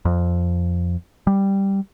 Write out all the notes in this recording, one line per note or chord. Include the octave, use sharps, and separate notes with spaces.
F2
G3